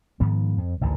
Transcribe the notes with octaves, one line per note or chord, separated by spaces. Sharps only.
G#2 D#3 F3 B3
F2
A1 D2 G#2 D#3